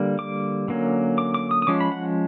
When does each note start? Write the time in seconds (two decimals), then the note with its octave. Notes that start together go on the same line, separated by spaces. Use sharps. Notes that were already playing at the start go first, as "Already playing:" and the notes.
Already playing: D3 G3 A#3
0.19 D6
0.68 D3 F#3 A#3 C#4
1.18 D6
1.34 D6
1.51 D#6
1.62 D#6
1.67 F3 G#3 C#4 D6
1.81 B5
1.92 F#5